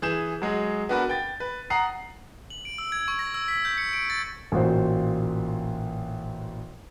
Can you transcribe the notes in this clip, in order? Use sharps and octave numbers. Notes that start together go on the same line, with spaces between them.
E3 G#4 G6 E7
F#3 G#3 G#4
B3 D4 F#4 A#4 B4
G5 A6
B4
F#5 A#5 D#6 C7
F#7
D7
E6
G#6
C#6
A#6
E6
B6
G6
C#7
D7
A6
A1 A#2 F4 F#4 C5